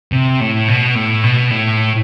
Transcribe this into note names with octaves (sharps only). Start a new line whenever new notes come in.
C3
A2
B2
A2
B2
A2